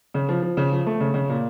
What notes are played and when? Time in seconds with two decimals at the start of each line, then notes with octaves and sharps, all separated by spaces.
0.14 C#3
0.29 F3
0.42 F3
0.57 C#3
0.72 F3
0.86 A3
1.00 C#3
1.14 C#3
1.29 A#2